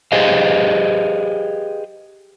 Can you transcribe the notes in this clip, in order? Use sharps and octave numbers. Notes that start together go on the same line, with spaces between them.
G4 G#4 B4 C5 D#5 F5